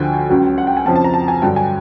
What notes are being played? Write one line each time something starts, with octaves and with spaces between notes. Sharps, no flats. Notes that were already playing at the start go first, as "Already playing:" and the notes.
Already playing: D2 D3 F3 G5 G#5
C#2 C#3 F#3
F#5
G5
G#5
F2 C#3 F3 A5
A5
A#5
A5
G#5
G2 D3 F#3 G5
G#5